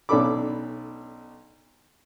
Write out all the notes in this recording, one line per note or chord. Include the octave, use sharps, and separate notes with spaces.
B1 C#4 D4 A4 B5 D6